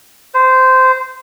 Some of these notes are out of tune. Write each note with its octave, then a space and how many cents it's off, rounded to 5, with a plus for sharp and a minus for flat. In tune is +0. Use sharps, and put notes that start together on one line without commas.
C5 -15